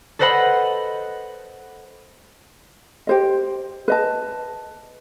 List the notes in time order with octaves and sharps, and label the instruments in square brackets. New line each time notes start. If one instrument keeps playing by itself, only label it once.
[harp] A4 B4 C5 D#5 F#5 B5
[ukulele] G4 C5 D#5
B4 D#5 A5